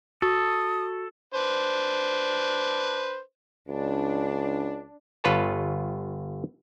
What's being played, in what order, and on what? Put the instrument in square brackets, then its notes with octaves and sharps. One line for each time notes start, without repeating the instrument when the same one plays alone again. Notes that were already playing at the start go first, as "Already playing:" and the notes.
[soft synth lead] F#4 [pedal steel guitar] A4 [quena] D#6
[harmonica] D4 B4 C5
[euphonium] C#2 [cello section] D4
[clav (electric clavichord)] G1 F4 B4 C#5 A5